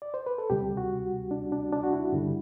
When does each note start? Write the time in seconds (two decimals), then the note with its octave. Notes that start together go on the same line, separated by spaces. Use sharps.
0.02 D5
0.14 C5
0.26 B4
0.38 A4
0.50 D2 C3 G3 G4
0.77 F#4
1.31 D4
1.52 D4
1.73 D4
1.83 F#4
1.93 E4
2.12 G2 D3 G3